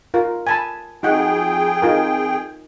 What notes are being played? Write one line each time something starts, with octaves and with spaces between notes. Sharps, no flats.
F4 A#4
G#5 A5 B5
F2 D#4 F#4 G#4 F#5 G5
D#4 F4 A#4